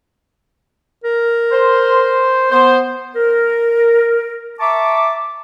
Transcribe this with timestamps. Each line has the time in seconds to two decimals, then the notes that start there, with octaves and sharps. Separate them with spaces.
1.04 A#4
1.52 C5
2.52 B3 C5
3.16 A#4
4.60 E5 A5 A#5 C#6 D6